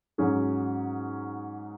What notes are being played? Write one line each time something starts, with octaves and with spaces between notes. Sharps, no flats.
G#2 F#3 C#4 G#4